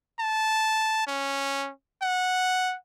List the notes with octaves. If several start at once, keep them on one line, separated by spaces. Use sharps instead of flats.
A5
C#4
F#5